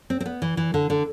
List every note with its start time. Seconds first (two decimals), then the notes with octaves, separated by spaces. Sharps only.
0.10 C4
0.20 C4
0.26 B3
0.42 E3
0.57 E3
0.74 D3
0.90 D3